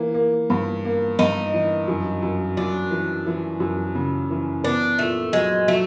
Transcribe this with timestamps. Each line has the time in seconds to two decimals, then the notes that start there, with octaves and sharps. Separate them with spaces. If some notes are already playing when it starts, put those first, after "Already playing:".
Already playing: E3 A#3
0.14 A#3
0.50 G2
0.85 A#3
1.19 G2 D#4
1.54 E3
1.88 F#2
2.22 F#2
2.57 F#2 D4
2.91 E3
3.26 E3
3.60 F#2
3.95 C#3
4.30 E3
4.64 B3 D4
4.99 A#2 A3
5.33 F#3 G#3
5.68 F#3 A3